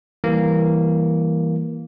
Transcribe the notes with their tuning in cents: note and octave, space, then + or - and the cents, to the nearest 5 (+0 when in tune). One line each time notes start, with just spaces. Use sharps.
E3 -5 G3 +0 A#3 +0